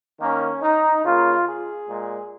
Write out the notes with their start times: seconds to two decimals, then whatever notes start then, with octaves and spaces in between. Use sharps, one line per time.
0.20 D#3 A#3 C#4
0.62 D#4
1.04 C#3 A#3 F4
1.47 G#4
1.89 A#2 G#3